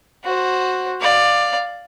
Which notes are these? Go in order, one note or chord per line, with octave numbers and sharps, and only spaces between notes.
F#4 C5
D5 F5